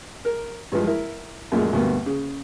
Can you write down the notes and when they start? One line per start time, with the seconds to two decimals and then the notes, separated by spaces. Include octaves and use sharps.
0.25 A#4
0.72 G2 E3 F3 G#3
0.87 E4 A#4
1.52 F#2 A#2 F3 G#3 A3
1.73 D2 G2 B2 A#3
2.06 C#3